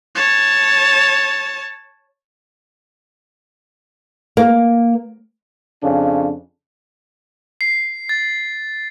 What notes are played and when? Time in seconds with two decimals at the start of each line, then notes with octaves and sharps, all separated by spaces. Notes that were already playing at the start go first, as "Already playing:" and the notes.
0.16 C#5 A5
4.37 A#3
5.83 F2 C#3 C#4 D4
7.61 C7
8.09 A6